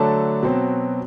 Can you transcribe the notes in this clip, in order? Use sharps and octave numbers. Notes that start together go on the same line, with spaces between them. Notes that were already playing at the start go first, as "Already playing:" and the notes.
Already playing: D3 F#3 A3 D4 A5
B2 F#3 C4